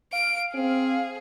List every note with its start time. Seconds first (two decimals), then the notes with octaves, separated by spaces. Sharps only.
0.13 F5 D7
0.55 C4 G#4